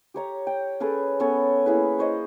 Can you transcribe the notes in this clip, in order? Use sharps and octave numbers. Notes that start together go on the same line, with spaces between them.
G4 C#5 A#5
G5
C#4 G#4 A4 B4
B3 C#4 A4 C#5
A#3 E4 G#4 B4
C5 C#5 D#5